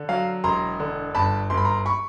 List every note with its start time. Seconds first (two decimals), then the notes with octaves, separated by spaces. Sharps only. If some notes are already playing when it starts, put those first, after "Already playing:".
Already playing: D3
0.09 F#3 F5
0.44 E1 A#5 C6
0.80 D3
1.15 G1 A5 B5
1.50 G1 C6
1.57 B5
1.65 A#5 C6
1.86 B5 C#6